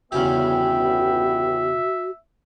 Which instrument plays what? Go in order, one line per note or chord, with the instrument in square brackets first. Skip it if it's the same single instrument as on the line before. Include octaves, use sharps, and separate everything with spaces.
[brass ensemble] G1 B3 G5 [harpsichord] E2 C#3 G4 [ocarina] F#4 [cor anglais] E5